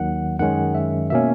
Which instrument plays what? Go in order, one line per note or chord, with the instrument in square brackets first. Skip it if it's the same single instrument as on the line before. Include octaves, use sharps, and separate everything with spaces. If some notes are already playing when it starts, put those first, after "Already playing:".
Already playing: [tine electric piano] D#2 D#3 F#3 F#5
F#2 D#3 G#3 C#4 F#5
E5
B2 A#3 C#4 E5